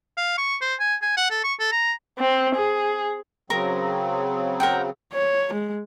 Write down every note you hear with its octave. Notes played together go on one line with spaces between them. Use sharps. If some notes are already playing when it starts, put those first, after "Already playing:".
F5
C#6
C5
G#5
G#5
F#5
A4
C#6
A4
A#5
C4
G#4
C#3 F#3 C4 A#4 A#5
A#4 F#5 G5
C#5
G#3